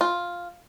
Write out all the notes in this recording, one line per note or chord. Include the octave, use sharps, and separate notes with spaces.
F4